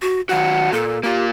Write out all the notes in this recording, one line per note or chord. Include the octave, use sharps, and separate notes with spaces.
F#4
D#3 F#3 F#4 F#5
A#2 A4
A#3 F4 G4